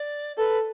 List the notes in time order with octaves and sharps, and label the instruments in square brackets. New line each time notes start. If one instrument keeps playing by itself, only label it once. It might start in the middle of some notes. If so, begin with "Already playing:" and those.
Already playing: [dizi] D5
[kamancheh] A4 [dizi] B4